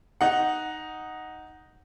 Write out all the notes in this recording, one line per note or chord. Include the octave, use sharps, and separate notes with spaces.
D#4 F#5